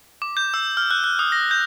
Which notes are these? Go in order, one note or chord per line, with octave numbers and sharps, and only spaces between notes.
D6
G6
E6
F6
F#6
F#6
D#6
A#6
G6